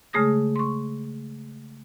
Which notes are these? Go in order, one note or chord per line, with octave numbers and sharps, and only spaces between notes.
C#3 G#3 A3 G#4 D#6 A#6
C6 C#6